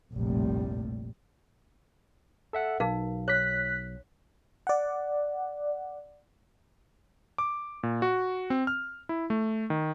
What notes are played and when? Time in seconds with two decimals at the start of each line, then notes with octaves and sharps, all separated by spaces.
0.13 F1 A#1 A2 C3 G3
2.53 A4 E5 F#5
2.80 B1 D#4 A#4 F5
3.28 C#5 F#6 B6
4.67 D5 F#5
7.38 D6
7.83 A#2
8.02 F#4
8.50 C4
8.67 F6
9.09 E4
9.30 A3
9.70 D#3